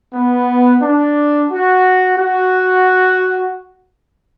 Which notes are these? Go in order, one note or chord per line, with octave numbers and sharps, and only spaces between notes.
B3
D4
F#4
F#4